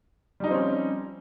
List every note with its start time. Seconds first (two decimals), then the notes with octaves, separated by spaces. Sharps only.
0.40 G3
0.44 D#4
0.47 F3
0.51 C4
0.54 C#4